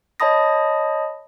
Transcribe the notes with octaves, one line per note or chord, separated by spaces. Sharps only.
C#5 D#5 A5 B5 D#6 A#6